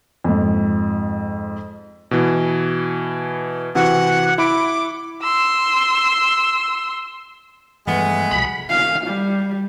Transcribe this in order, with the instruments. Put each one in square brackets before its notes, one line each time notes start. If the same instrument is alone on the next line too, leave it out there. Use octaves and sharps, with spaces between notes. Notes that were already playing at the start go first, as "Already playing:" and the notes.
[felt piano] F2 G#2
[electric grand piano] B2 E3
[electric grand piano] C3 E3 F#4 [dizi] F#5
[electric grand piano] E4 B5 D7 [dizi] D6
[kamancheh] C6 E6
[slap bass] G2 E3 F3 [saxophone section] G#3 A3 B3
[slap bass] C2 B2 F3 [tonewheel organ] B5
[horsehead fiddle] F5
G3